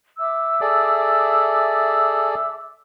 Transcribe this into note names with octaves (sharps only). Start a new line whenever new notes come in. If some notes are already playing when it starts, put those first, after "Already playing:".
E5 D6 E6
G#4 A4 D5